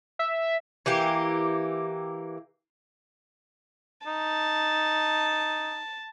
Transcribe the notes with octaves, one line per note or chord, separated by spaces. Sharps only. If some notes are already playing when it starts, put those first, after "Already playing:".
E5
E3 A#3 G4
D#4 A5